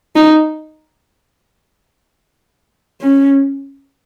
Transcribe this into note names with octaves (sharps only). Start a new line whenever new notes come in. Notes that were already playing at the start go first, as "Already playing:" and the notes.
D#4
C#4